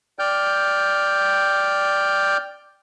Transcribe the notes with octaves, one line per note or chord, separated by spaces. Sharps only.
D5 G5 F6 G6